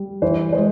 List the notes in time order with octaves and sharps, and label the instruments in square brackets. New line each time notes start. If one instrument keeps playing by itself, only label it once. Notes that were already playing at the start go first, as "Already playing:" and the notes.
Already playing: [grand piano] G3
[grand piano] E3 [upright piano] C5
[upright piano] C5
[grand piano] G#3